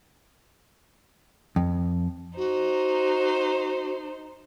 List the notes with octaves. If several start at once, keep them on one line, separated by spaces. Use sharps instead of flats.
F2
D#4 F#4 C5